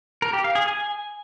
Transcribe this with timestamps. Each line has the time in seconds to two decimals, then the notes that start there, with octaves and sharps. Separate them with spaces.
0.22 A#4
0.33 G4
0.44 F5
0.55 G#4
0.66 G#5